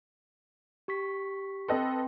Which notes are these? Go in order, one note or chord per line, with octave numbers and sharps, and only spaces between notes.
G4 C#6 B6
C4 A4 B4 D#5 G5 C6